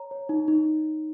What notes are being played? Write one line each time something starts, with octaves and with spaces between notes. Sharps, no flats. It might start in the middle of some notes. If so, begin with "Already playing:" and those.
Already playing: C#5 A#5
C#5
D#4
D#4